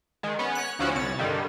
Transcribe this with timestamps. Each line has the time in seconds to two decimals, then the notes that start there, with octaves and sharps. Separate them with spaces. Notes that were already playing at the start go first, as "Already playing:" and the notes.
0.23 D#3 G#3
0.39 B3 C#4
0.55 C#5 F#6
0.79 D2 F3 C#4 E4 F#4
0.95 C2 C#5 A6
1.19 G2 D3 D#3 G3